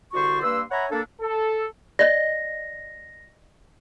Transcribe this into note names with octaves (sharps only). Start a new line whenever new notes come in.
C2 D3 F#4 C5 D5 C#6
G2 A#3 B4 C6 E6
C#5 E5 F#5 G#5 A#5 B5
A#3 D4 A4
A4
D5 D#5 A#6